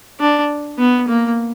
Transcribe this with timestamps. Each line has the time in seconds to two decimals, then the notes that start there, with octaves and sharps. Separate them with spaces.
0.20 D4
0.79 B3
1.08 A#3